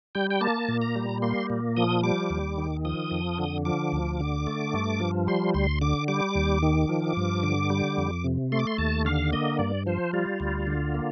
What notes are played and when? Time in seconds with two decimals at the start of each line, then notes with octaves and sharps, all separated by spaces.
0.15 G3 G5
0.30 G5
0.41 A#3 A5
0.68 A#2
0.82 A#5
0.96 G3
1.22 A#3 C6
1.50 A#2
1.77 F3 D#6
2.03 G3 D6
2.30 D#2
2.58 D#3
2.85 F3 D#6
3.11 F2
3.38 D3
3.65 F3 D6
3.92 D2
4.20 D3
4.47 A3
4.73 G2
5.00 F3
5.27 G3 C6
5.54 D2 C6
5.81 D3 D6
6.08 G3 D6
6.35 D#2
6.63 D#3
6.89 F3
7.17 G2
7.43 D3
7.70 G3
7.97 F2
8.24 C3
8.52 A3 C6
8.59 D6
8.67 C6
8.78 D#2 A5
9.05 D3 F5
9.32 A#3 D#5
9.59 G2 D5
9.86 F3 C5
10.13 G3 F4
10.40 D2
10.67 D3
10.94 A#3